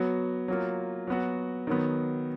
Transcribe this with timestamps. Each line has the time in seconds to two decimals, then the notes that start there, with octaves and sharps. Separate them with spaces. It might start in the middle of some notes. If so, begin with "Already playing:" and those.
Already playing: F#3 B3 F#4
0.48 F#3 A#3 F4
1.07 F#3 B3 F#4
1.67 D#3 F#3 B3